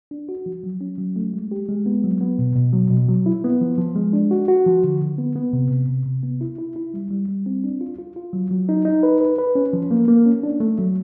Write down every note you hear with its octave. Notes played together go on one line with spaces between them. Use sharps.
D4
F#4
F3
F#3
C#4
F#3
A3
G#3
G4
G#3
B3
F#3
B3
B2
B2
F#3
B2
F#3
E4
B3
F3
F3
G#3
D4
F#4
F#4
F3
D3
D3
B3
B3
C3
C3
C3
C3
B3
E4
E4
E4
G3
G3
G3
C4
D4
F4
F4
F4
F#3
F#3
D#4
D#4
B4
B4
B4
C#4
F3
A#3
A#3
C#4
D4
A3
F#3